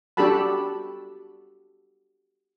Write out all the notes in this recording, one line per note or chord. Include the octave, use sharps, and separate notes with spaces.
D4 F#4 G4 A4 A5 B5